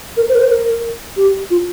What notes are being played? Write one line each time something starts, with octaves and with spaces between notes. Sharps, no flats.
A#4
C5
A#4
C5
A#4
G4
F4